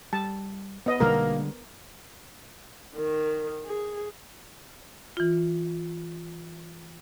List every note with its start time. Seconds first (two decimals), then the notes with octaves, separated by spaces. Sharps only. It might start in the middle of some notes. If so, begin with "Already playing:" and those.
0.13 G3 A5
0.86 B3 D#5
1.00 B1 B2 D3 G3 G#3 A#3 A#4
2.96 D#3
3.65 G#4
5.17 E3 F4